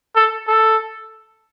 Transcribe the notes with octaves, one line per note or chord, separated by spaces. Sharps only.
A4
A4